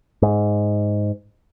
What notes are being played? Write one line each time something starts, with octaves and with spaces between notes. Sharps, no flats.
G#2